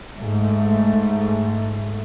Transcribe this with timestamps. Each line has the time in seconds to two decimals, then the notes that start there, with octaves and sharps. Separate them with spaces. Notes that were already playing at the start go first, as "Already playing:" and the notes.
0.18 G#2 A3